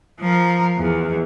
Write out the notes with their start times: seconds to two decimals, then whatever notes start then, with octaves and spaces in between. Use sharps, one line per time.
0.19 F3 A#4
0.77 E2